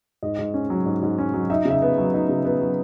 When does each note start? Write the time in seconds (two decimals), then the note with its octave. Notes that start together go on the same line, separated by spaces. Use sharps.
0.23 G#2 D#5
0.39 G#2
0.54 C#4
0.70 F#3
0.86 G#2
1.03 G#2
1.18 C#4
1.34 F#3
1.50 D#4 E5
1.65 C#3
1.71 E5
1.82 B3
1.98 F#3
2.14 D#4
2.29 C#3
2.45 B3
2.61 F#3